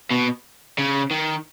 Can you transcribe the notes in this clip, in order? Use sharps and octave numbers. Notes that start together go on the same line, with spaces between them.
B2
C#3
D#3